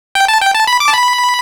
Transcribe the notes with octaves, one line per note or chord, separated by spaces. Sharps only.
G5
A5
G5
A5
B5
D6
A5
B5